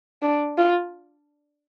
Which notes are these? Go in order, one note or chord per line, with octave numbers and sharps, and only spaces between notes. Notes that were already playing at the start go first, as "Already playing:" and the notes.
D4
F4